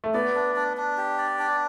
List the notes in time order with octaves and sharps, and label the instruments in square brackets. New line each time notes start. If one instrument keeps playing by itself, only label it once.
[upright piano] A3
[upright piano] B3 [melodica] D5
[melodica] D4
D4
D4
G4
D5
D4